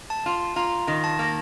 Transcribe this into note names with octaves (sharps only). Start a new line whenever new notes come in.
A5
F4
F4 A#5
D#3
A5
A#3